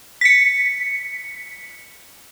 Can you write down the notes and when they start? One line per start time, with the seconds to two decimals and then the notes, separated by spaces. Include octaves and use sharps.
0.21 B6 C#7